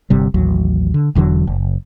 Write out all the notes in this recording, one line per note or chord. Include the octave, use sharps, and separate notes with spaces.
G1 C3 G3
A1 D#2 F#3
D3
E1 E2 D3 F#3
F#1